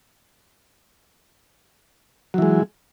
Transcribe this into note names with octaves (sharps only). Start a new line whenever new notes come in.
E3 F#3 G#3